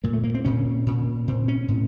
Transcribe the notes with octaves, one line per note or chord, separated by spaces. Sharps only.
A#2 A#3
A3
A#3
C4
A#2 C#4
A#2
A#2 C4
C#4
A2